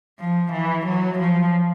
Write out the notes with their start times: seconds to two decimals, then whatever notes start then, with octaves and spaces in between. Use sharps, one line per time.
0.19 F3
0.52 E3
0.86 F#3
1.19 F3